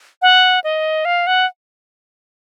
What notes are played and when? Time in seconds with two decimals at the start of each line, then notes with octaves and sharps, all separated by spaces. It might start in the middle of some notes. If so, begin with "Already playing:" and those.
0.22 F#5
0.64 D#5
1.05 F5
1.27 F#5